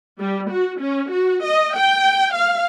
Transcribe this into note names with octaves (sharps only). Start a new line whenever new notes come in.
G3
F#4
C#4
F#4
D#5
G5
F5